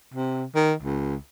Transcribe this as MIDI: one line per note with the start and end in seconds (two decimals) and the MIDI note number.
0.14 0.44 48
0.56 0.74 51
0.83 1.15 37